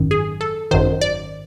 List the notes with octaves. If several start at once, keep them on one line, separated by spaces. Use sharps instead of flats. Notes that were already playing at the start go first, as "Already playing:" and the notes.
Already playing: G#1 F#2 D#3
G#4
A4
G#1 F#2 D#3 C5
D5